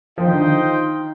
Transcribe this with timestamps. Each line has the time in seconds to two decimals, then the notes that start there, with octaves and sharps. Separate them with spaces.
0.18 F3 F4 C5 D#5 G5
0.27 D#3
0.33 D3
0.42 D#3